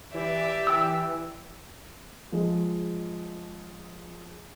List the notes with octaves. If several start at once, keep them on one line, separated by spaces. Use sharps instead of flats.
E3 G4 D5 E5
E3 G5 E6
F3 G#3